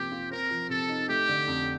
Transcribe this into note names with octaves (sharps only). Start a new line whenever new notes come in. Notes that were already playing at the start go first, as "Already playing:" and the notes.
Already playing: C3 F3 A#3 G4
F4
C4 A#4
F3
C3 A4
D#4
A3 G4
D3
F2